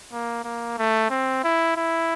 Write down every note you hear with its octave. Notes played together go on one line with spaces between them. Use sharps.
A#3
A#3
A3
C4
E4
E4